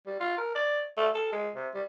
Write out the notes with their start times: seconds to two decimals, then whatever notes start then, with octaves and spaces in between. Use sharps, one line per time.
0.06 G3
0.20 F4
0.38 A#4
0.55 D5
0.97 A3
1.14 A4
1.32 G#3
1.55 C3
1.74 G3